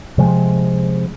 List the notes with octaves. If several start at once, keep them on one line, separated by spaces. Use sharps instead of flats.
C3 F3 G#3